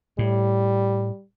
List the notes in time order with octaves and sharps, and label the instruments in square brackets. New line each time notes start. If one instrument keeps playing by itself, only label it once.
[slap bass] A2 [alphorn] G3